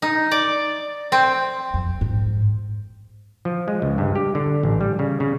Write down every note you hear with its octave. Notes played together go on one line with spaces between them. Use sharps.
D#4
D5
C4
F2
G#2
F3
G#3
C#2
G2
G4
D3
A1
G3
C#3
C#3